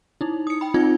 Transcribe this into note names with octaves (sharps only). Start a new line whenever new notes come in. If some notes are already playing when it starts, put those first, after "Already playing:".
D#4 E4
D#6 C#7
G5 B5
C4 D#4 F4 G#6